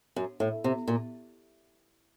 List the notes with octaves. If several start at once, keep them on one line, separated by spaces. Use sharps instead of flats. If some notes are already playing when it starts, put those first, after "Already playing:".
F#2
A2
C3
A#2